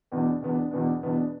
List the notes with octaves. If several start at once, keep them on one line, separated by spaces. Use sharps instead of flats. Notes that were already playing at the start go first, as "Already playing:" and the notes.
E2 B2 B3 D4
E2 B2 B3 D4
E2 B2 B3 D4
E2 B2 B3 D4